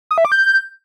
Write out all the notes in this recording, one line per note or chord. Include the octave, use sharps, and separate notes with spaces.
D#6
E5
D6
G6